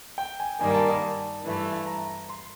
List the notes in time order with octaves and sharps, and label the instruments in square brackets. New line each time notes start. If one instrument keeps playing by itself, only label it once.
[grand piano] G5
G#5
[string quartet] G2 D#3 G3 A#3 [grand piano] G#5
[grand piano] A5
A5
[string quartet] G2 E3 A3
[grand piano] A#5
C6